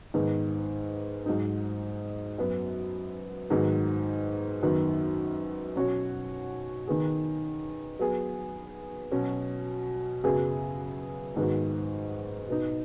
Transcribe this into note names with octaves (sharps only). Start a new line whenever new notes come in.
G#2 D#3 B3
G#2 F#3 D#4
F#2 F#3 B3
G#2 D#3 F#3 B3
F#2 D#3 B3
B2 F#3 C#4 F#4 C#5
D#3 B3 G#4
F#3 B3 G#4
B2 F#3 C#4
F#2 C#3 F#3 B3 G#4
G#2 D#3 B3 F#4
B2 B3 D#4